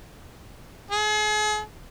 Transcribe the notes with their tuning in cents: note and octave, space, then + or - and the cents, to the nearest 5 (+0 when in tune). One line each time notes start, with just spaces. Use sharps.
G#4 +40